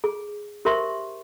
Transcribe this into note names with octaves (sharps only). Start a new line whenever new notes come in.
G#4
G4 A#4 C5 E5 C6 C#6